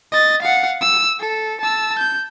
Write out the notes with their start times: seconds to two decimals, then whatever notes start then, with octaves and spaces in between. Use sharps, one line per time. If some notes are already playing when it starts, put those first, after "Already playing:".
0.12 D#5 A6
0.42 F5 F#5
0.81 E6
1.20 A4
1.61 A5 E6
1.99 G6